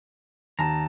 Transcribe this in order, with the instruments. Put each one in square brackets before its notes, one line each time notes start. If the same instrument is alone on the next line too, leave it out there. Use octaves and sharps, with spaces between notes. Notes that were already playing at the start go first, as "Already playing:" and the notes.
[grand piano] D#2 A5 [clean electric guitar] A#5